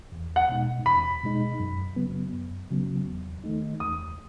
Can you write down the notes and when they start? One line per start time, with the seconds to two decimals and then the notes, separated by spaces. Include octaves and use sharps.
0.12 E2
0.36 F#5
0.49 B2 G#3 D#4
0.86 E2 B5
1.23 B2 G#3 D#4
1.60 F#2
1.96 C#3 F#3 B3
2.33 F#2
2.70 C#3 F#3 B3
3.07 E2
3.44 D#3 A3 D#4
3.80 E2 D#6